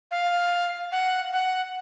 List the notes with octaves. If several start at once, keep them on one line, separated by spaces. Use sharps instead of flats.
F5
F#5
F#5